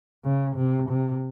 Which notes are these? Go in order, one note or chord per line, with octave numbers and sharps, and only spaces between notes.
C#3
C3
C3